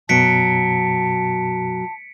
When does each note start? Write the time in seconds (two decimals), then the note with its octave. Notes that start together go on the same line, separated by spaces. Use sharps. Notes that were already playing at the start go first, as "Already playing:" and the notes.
0.09 F#2 B2 F#3 A5 B6 C#7 D7